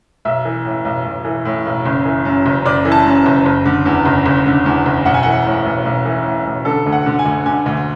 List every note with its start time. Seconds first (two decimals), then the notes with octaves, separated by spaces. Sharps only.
0.25 B1 E5
0.45 E3
0.65 A2
0.85 B1
1.05 B1
1.25 E3
1.45 A2
1.66 B1
1.85 F#1
2.05 E3
2.25 F#2
2.46 F#1
2.65 F#1 D5
2.85 E3
2.92 A5
3.06 F#2
3.26 F#1
3.46 F#1
3.65 D3
3.86 E2
4.05 F#1
4.26 F#1
4.46 D3
4.66 E2
4.86 F#1
5.06 B1 F#5
5.14 G#5
5.23 E3 F#5
5.45 A2
5.65 B1
5.85 B1
6.05 E3
6.26 A2
6.46 B1
6.65 D3 A4
6.86 D2
6.92 F#5
7.06 D3
7.19 G#5
7.25 D2
7.46 D3 G#5
7.66 D2